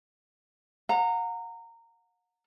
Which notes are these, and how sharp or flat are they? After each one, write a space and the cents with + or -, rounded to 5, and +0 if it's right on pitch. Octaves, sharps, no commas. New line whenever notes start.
F#5 -40 A#5 -20